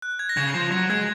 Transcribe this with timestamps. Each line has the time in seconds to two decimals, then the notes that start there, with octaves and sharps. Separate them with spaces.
0.02 F#6
0.19 G#6
0.29 A#6
0.37 C#3 G#6
0.54 F3
0.72 F#3 A#6
0.90 G#3 G#6